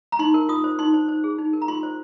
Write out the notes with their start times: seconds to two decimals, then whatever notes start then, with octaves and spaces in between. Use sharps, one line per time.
0.12 A#5
0.19 D#4 C6
0.34 A#4
0.49 F4 D#6
0.64 C5
0.79 D#4 C6
0.94 C5
1.08 C5
1.24 G#4
1.38 D#4
1.53 A#4
1.62 A#5
1.68 F4 C6
1.83 C5